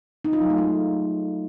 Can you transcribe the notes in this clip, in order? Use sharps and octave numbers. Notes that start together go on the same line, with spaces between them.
D#4
F4
F#3
A3
G#3